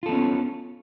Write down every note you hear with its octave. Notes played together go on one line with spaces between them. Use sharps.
B3 C#4 F4 A4